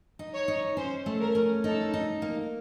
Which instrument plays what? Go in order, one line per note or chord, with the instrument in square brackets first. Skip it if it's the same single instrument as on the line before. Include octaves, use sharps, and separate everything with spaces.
[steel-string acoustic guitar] D#4
[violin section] C#5
[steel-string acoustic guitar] D#4
[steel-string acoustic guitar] C#4 [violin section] C5
[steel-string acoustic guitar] A3
[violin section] A#4
[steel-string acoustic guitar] C#4
[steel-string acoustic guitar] D#4 [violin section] A4
[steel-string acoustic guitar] D#4
A#3